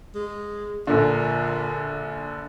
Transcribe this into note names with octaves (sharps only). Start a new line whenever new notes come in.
G#3
A#1 A#2 D3